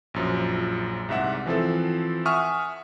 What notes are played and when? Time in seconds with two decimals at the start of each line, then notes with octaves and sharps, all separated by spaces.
0.14 A#1 F#2 F3
1.09 C2 G#2 E5 F#5
1.46 E3 F3 C4 A4
2.25 E5 F#5 G#5 C#6 D#6 F6